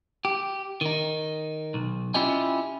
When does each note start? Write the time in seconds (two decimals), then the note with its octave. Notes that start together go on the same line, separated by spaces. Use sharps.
0.25 G4
0.81 D#3 D#4
1.74 B1
2.14 C#4 E4 F4 G4 D#5 G#5